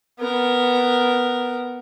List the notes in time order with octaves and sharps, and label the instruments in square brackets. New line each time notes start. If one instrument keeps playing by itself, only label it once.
[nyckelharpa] B3 A#4